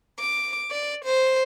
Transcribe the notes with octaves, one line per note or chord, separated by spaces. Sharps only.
D6
D5
C5